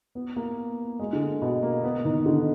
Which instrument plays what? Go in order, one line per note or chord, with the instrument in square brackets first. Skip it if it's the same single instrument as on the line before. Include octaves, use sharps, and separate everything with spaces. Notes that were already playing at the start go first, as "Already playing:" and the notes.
[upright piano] B3
A#3
G#3
D3
B2
A#3
B3
D#3
D3